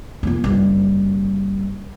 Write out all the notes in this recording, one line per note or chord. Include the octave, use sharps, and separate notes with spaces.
F3 A#3
F#1 G3